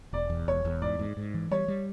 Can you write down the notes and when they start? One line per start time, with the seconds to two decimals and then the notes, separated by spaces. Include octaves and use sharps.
0.13 E1 D5
0.30 E2
0.48 E1 C#5
0.65 E2
0.82 G#2 D5
0.99 G#2
1.17 G#2
1.34 E3
1.51 G3 C#5
1.68 G3